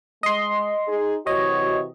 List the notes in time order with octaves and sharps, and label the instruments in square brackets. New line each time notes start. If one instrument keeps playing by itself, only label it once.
[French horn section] G#3 [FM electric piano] D#5 C6
[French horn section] D#4 G#4
[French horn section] C3 E3 F#4 [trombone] C#5 [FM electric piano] D#5